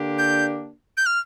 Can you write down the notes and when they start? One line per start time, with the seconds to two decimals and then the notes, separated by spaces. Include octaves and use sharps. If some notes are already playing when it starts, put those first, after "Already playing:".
Already playing: D3 A#3 D4 G4
0.18 G6
0.97 G6
1.06 F6